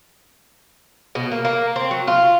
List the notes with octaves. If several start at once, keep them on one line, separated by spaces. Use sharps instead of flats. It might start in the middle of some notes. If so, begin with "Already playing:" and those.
B2
A#3
A#3
C4
F#3
F4